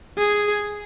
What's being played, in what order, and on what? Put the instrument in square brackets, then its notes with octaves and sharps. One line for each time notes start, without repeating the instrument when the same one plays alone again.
[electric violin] G#4